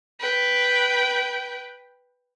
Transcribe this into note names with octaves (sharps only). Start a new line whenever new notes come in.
B4 G5